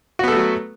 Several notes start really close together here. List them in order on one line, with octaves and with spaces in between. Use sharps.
F#4 B3 A4 A3 F#3